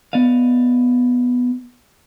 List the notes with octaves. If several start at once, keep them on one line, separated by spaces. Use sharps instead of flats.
B3 D5 D#5 F5